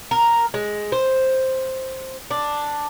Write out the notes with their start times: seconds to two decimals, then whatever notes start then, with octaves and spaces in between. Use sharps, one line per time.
0.11 A#4
0.54 G#3
0.92 C5
2.31 D4